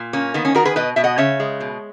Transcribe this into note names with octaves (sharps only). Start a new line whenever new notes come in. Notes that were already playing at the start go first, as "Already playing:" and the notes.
Already playing: A#2
A#3 C#4
D#3 B3
C#4
D#3 F#4 A#4
G#4 B4
B2 B4 D#5
B2 E5
D#5 F#5
C#3 C#5 E5
G#3
B2